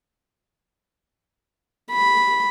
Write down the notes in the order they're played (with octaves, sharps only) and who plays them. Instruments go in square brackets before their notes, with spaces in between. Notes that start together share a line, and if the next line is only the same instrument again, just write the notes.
[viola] B5